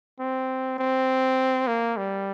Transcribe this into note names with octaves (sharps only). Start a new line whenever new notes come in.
C4
C4
A#3
G3